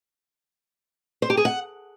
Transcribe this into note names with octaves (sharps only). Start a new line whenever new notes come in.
C5
G4
G#4
F#5